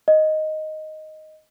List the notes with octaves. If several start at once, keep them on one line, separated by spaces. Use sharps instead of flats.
D#5